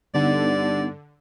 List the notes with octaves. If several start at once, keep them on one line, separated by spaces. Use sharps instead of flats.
G2 D3 B3 D#4 D5 F#5